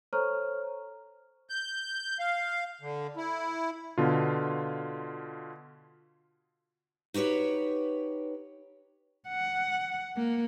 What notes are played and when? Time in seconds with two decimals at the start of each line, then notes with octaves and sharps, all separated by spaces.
0.13 A4 C5 C#5 A#5 C#6 F6
1.50 G6
2.19 F5
2.81 D3
3.17 E4
3.98 B2 D3 F4
7.14 D#4 F#4 G4 B4 C#5
9.29 F#5
10.17 A#3